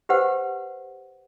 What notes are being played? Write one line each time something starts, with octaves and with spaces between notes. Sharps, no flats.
G4 B4 C5 F#5